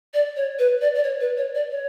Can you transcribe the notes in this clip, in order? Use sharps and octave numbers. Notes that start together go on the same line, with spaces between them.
D5
C#5
B4
D5
D5
C#5
B4
C#5
D5
C#5